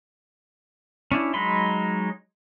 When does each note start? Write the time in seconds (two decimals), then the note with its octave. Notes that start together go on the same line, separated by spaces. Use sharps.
1.12 C#4 D4 E4
1.34 F#3 G#3 D#4 B5 C6